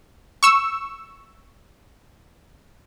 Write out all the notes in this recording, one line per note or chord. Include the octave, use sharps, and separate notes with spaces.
C#6 E6